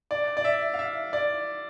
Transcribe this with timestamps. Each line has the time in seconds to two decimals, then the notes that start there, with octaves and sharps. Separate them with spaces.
0.11 D5
0.37 D5
0.44 E5
0.74 F5
0.79 E5
1.13 D5